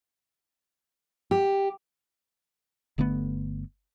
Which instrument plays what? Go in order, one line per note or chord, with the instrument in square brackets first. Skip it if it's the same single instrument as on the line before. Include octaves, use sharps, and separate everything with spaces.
[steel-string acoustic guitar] G4
[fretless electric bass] G1 D3 A3 B3